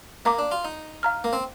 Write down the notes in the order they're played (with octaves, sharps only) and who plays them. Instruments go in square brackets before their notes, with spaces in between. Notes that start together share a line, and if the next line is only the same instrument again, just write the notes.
[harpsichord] A#3 [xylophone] F5 A#5 D6
[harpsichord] D4
F4
D#4
[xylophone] F5 A#5 F6
[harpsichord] A#3
C4